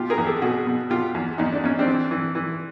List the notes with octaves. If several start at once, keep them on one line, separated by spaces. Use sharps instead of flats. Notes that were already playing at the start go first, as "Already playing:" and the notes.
Already playing: B2 F4 G4
G#4 A#4
E2
G4 A4
B2 F#4 G#4
B2
B2 F4 G4
E2
E2 D#4
D4
E2 C#4
C4 D4
E3
E3
E3